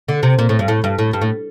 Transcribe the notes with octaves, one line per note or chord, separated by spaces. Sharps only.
D3
C3
A#2
A2
G2
A2
G2
A2
G2
A2